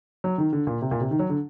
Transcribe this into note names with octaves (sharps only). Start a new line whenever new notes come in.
F#3
D#3
D3
A#2
C3
A#2
C3
D#3
F#3
D3